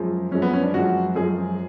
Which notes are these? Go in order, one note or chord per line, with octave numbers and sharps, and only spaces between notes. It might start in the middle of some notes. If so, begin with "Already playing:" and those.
Already playing: F#2 F3 G#3
F#2 F3 G#3 C#4
B3
C#4
D4
F#2 F3 G#3 F#4
F#2 F3 G#3 G#4